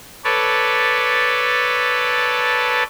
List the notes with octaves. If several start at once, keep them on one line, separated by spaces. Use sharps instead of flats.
A4 B4 C#5 D5